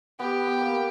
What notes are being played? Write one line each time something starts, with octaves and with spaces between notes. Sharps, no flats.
B3 G4
B3
A#3